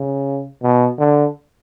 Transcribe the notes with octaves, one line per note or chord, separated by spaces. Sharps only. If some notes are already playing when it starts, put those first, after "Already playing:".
Already playing: C#3
B2
D3